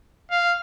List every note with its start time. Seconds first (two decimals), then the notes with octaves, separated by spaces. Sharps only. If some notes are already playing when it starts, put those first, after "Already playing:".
0.31 F5